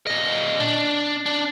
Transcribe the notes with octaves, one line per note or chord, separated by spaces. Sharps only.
A#2 D#5
D4
D4